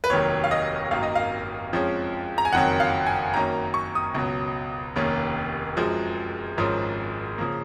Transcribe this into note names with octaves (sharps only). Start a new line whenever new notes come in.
B4
F1 D#2 D#3 F#3 C#5
F5
D#5
G#1 F#2 D#3 A#3 F5
D#5
F5
F2 F3 G#3 C#4
A#5
G#5
F#1 F2 D#3 F#3 F#5
F5
G#5
F#2 D#3 A#3 C#4 A#5
C#6
D#6
C#2 B2 F#3
F1 D#2 D#3 A#3 C#4
F#2 F3 G#3
G#1 G#2 F3 G#3 C#4
C#3 F3 A#3